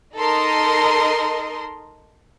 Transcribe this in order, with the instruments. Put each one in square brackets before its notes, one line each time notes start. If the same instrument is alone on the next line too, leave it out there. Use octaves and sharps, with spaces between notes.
[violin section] D#4 A4 A#4 D#5 C6